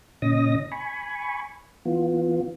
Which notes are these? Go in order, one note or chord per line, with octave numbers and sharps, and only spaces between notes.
A#2 C#3 C#4 D#5 D#6 A#6
G#5 B5 C#6
E3 B3 F4